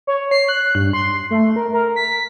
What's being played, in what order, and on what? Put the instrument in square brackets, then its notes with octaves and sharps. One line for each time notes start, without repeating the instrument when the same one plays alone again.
[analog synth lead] C#5
C7
F#6
G2
C6
A3
A#4
A#4
B6